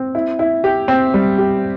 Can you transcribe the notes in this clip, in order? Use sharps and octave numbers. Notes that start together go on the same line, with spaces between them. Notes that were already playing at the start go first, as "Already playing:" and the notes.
Already playing: C4
E4
E4
G4
C4
G3
G4